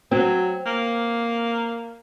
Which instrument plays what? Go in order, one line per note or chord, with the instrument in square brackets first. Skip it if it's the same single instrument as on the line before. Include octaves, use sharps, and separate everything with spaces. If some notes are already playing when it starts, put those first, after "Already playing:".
[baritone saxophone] F#3 [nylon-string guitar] C4
[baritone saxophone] A#3